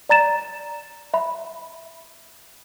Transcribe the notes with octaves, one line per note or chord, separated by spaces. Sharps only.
D5 A#5 A6 E7
E5 B5